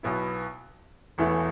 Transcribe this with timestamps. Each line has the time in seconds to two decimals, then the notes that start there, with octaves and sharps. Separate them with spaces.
0.03 B1 B2 B3 E4
1.18 E1 E2 E3 A3